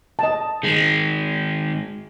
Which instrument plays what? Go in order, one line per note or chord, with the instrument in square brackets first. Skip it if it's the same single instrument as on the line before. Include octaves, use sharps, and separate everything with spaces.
[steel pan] D#5 A5
[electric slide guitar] D#3 G#3 [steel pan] G#4